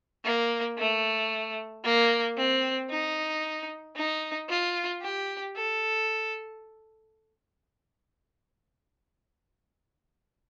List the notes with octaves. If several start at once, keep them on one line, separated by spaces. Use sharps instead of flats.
A#3
A3
A#3
C4
D#4
D#4
F4
G4
A4